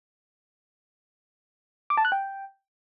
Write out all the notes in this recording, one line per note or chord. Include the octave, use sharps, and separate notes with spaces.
D6
A5
F#6
G5